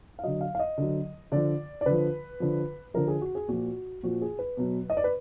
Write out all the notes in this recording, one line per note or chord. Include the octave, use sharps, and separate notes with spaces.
F5
D3 F#3 D#5
F5
F5
D#5
D3 F#3
D3 F3 D5
D5
D3 F3 B4
D3 F3
D3 F3 A#4
G#4
F#4
G#4
A#2 F3 F#4
A#2 F3 F#4
G#4
B4
B2 F#3
D#5
D5
B4